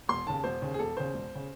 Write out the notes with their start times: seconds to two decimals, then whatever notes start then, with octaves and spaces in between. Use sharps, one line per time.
0.09 E1 C6
0.27 D#2 C#3 A5
0.44 E1 C5
0.61 D#2 C#3
0.74 G#4
0.79 E1 A4
0.96 D#2 C#3 C5
1.14 E1
1.35 C#3